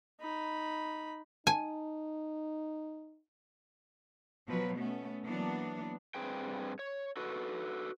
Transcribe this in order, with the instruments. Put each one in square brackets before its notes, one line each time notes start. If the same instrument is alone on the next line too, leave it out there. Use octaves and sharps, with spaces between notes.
[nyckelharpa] D#4 B5
[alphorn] D#4 [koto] G#5 [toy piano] A5
[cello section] B2 F3 F#3 B4
A3 B3 C#4
E3 F#3 A#3 B3 D4
[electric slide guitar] G2 C4 G#4 B4 G5
C#5
F#4 A4 B4